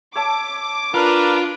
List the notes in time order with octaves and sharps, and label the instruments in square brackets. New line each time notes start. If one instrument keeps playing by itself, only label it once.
[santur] C#5 E5 A5 [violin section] D6
[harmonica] D4 A#4 B4 [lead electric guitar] F4